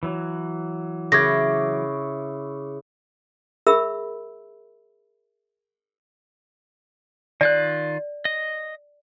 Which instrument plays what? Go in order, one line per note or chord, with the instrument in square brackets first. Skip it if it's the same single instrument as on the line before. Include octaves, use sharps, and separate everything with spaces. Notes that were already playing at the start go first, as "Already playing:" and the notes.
[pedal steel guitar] E3 F#3
[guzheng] C#3 [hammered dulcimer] E4 C#6 D6 [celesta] G#6 A#6
[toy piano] G#4 A#4 E5 B5 E6
[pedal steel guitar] D#3 F4 F#6 [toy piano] D5
[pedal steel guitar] D#5